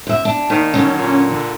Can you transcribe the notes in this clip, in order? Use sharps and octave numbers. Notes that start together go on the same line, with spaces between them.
F#2 E5
D4
D#2 D#3
D3 F#3 C#4
A#2
D3